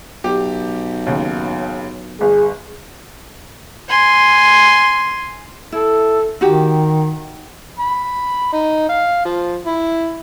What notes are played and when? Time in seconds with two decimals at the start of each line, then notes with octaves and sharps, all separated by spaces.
0.24 B1 G4
1.06 D#2 C#3
2.21 G1 G#4
3.89 G#5 C6
5.72 E4 A4
6.41 D#3 D#4 F#4 G4
7.79 B5
8.53 D#4
8.89 F5
9.25 F3
9.66 E4